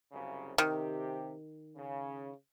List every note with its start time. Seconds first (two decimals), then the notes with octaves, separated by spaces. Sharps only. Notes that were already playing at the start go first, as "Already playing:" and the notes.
0.12 C2 F#2 C#3
0.58 C3 D#3 G4
1.76 C#3